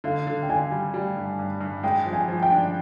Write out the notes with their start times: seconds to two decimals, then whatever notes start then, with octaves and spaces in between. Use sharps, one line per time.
0.04 D3 F5
0.27 D3
0.43 G5
0.49 D3 G#5
0.71 G3
0.94 G3
1.16 G2
1.39 G2
1.61 G2
1.83 G#3 G5
2.06 F3
2.13 G#5
2.28 F3
2.43 G5
2.51 D4